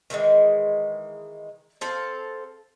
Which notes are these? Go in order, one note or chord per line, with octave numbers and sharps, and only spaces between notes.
D#3 E3 F#3 G#3
C4 A4 F5